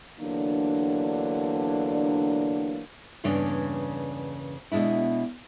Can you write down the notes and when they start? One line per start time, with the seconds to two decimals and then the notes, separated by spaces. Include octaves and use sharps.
0.19 E2 D3 F#3 A#3 D4
3.24 E2 G2 C#3 A#3 C#4 D4
4.72 B2 G#3 D4 E4